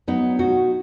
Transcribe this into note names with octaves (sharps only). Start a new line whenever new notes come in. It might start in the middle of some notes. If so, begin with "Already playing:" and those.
F#3 B3 D#4
B2 D#4 F#4